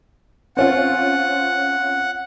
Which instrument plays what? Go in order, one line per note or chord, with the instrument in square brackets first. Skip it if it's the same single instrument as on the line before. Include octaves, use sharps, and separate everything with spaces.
[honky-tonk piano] C4 C#4 F4 [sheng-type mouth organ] F#5